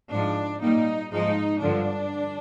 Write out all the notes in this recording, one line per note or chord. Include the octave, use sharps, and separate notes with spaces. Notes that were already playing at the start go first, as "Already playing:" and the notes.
G#2 F3 G#3 D4
A#2 G3 A#3 D#4
G#2 F3 G#3 D#4
G2 D3 F3 D4